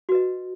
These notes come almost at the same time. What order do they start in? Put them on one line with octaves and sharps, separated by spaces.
F#4 B4 D#5